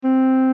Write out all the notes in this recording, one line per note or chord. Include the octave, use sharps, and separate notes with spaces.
C4